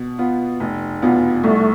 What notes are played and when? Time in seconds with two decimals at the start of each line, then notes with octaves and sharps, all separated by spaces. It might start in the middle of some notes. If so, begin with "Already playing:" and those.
Already playing: B2
0.18 B3 F4
0.60 F1
1.02 E2 B2 B3 F4
1.44 C2 A3